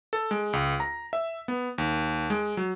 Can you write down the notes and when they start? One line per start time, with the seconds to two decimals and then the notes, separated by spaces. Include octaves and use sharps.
0.13 A4
0.31 G#3
0.53 C#2
0.80 A#5
1.13 E5
1.48 B3
1.78 D#2
2.30 G#3
2.57 F#3